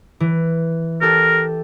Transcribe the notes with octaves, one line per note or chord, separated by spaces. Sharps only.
E3
G4 A4 A#4